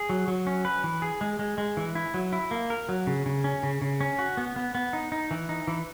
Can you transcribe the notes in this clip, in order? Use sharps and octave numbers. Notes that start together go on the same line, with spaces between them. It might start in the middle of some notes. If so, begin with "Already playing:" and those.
Already playing: G#4
F#3
F#3
C#4
B4
E3
G#4
G#3
G#3
G#3
E3
E4
F#3
E4
A#3
A#4
F#3
C#3
C#3
C#4
C#3
C#3
C#4
F#4
B3
B3
B3
D#4
D#4
E3
D#4
E3